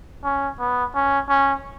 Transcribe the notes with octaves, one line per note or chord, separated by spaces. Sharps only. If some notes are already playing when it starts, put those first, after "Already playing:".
C#4
B3
C#4
C#4